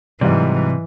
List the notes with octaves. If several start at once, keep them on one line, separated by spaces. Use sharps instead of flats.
G#2 C3 E3 F#3 G3